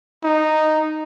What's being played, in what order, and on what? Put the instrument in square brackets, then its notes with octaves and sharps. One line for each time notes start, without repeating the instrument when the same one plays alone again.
[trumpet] D#4